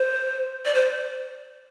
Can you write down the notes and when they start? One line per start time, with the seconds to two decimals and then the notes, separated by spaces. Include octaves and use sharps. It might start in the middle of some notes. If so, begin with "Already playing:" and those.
Already playing: C5
0.65 D5
0.74 C5